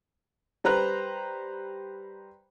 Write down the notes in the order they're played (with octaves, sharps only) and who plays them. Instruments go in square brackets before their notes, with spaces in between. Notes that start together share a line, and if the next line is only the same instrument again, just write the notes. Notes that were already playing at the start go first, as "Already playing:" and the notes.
[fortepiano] G3 B4 C5 A#5 F#6